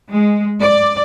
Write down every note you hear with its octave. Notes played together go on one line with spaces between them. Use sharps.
G#3
D5